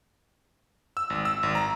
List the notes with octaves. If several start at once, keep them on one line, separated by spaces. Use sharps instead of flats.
E6
G#1
E6
G#1
A#5